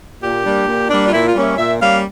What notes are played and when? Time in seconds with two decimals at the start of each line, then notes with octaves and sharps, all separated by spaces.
0.21 A#2 G4
0.44 G3 A#3 D4
0.66 A#2
0.89 G3 A#3 D4
1.07 F4
1.12 A#2 E4
1.27 F4
1.35 G3 A#3 C#4
1.42 E5
1.57 A#2 E5
1.80 G3 A#3 C#4 F5